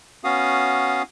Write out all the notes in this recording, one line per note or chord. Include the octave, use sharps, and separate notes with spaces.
B3 C#4 F#4 F5 D#6